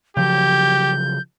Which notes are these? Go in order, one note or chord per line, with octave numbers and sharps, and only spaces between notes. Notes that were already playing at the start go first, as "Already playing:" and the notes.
C#3 F3 F#3 G4 G6